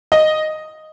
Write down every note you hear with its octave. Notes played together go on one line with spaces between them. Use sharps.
D#5